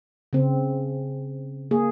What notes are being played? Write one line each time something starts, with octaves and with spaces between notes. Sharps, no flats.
C#3 C4
A#3 G#4